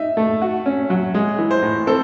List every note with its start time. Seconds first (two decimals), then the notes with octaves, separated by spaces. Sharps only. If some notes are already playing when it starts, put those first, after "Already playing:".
Already playing: D#4 E5
0.17 A3
0.42 F#4
0.66 C#4
0.90 F#3
1.15 G#3
1.38 E3
1.51 C5
1.62 A2
1.87 C4 A4